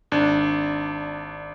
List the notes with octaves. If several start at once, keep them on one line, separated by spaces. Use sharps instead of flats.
G#1 D4